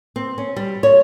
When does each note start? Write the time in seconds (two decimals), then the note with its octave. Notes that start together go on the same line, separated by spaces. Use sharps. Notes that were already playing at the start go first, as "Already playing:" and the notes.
0.16 C4
0.38 C#4
0.56 G3
0.83 C#5